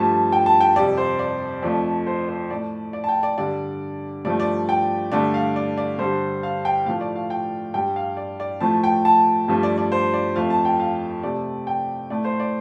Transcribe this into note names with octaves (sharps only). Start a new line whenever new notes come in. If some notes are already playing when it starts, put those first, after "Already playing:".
Already playing: G2 F3 A3 A5
G5
A5
G5
F2 C3 G3 D5
C5
D5
F2 F3 A3 D5
C5
C5
A2 A3 D5
D5
A5
G5
D5
G2 D3 G3 D5
G2 F3 A3 D5
D5
G5
G2 D3 A3 D5
F5
D5
D5
G2 D3 G3 C5
F5
G5
A2 F3 A3 F5
D5
F5
G5
G2 G3 G5
F5
D5
D5
A2 F3 A3 A5
G5
A5
G2 F3 A3
D5
D5
C5
D5
F2 F3 A3 F5
A5
G5
F5
C3 A3 D5
G5
A2 A3 D5
C5
D5